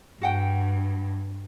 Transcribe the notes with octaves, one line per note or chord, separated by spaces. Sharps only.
G2 F#4 F#5 G5